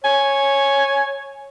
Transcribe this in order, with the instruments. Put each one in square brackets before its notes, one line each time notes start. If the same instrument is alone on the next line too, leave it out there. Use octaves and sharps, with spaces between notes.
[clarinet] C#5 [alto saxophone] G#5